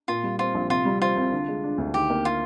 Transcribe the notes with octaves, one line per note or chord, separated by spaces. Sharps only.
A#2 F4
G3
C4 F4
A#1
C3 F4
G3
C4 F4
C2
D3
G#3
D4
D2
D#3 G4
A#3
F4